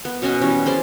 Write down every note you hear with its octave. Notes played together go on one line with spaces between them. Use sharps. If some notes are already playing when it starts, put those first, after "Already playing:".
B3
B2 C#4 D#5 G#5
E3 G3 C#4
G#4 C5 D5 C6